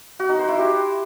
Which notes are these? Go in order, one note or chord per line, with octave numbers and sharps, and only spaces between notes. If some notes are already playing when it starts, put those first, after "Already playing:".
F#4
D#4
C5
E4
G4